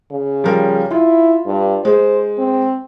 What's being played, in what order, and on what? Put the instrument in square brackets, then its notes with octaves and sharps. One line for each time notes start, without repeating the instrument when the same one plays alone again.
[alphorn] C#3
[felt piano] F3 G3 A#4
[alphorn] E4 [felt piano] F4
[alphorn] G2
[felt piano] G#3 [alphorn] C5
[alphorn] C4